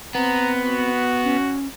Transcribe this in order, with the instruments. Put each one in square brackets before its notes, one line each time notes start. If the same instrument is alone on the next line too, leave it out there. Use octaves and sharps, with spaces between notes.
[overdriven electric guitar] B3 [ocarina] C4 [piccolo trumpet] A#5
[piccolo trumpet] F#4
[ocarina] C#4